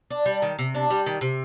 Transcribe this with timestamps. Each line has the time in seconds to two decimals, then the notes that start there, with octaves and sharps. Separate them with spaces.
0.11 D4
0.26 G3
0.42 D#3
0.59 C3
0.75 D4
0.90 G3
1.06 D#3
1.21 C3